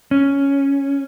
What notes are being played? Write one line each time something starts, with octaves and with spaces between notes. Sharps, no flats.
C#4